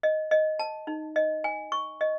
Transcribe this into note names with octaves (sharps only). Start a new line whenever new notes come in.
D#5
D#5
A5
D#4
D#5
G#5
C#6
D#5